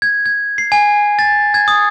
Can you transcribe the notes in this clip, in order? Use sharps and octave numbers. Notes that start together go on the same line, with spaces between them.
G#6
G#6
C7
G#5
A6
G#6
D#6